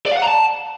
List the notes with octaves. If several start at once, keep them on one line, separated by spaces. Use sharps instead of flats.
D5
F5
F#5
A#5
A5